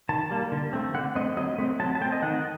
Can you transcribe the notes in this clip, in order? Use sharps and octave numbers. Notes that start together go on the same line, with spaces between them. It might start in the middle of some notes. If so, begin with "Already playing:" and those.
D#3 A5
G3 A#3
D3
A3 C4
D3 F#5
A3 C4 D#5
F#3 D#5
A3 C4
F#3 A5
A5
A3 C4 G5
D#5
D#3 F#5